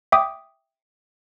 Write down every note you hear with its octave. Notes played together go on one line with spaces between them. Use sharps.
E5 G5 D6 D#6